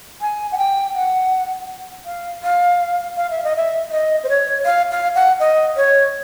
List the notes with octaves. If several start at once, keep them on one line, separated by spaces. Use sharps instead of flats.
G#5
F#5
G5
F#5
F5
F5
F5
E5
D#5
E5
D#5
C5
C#5
F5
F5
F#5
D#5
C#5